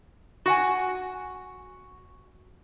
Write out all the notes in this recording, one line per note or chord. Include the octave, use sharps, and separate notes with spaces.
F#4 F#5 G#5